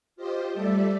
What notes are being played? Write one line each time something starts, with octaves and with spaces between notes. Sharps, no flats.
F4 G4 C5 D#5
G3 A3 A4 D5 E5